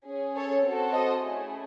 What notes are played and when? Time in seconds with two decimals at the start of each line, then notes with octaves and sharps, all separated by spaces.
0.08 C#4 G#4
0.36 A4 C#5
0.64 C4 F#4 A4
0.93 C5 D#5
1.22 A3 C#4 E4 G#4